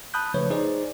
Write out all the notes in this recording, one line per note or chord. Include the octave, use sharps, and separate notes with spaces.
A5 B5 D#6 F#6 G6
C#3 F3 A3 B4 C#5
D#4 G#4 C5 D5